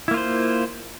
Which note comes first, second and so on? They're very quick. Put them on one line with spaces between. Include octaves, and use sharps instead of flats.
E4 A#3 F4 C5